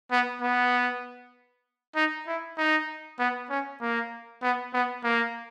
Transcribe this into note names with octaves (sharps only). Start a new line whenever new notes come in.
B3
B3
D#4
E4
D#4
B3
C#4
A#3
B3
B3
A#3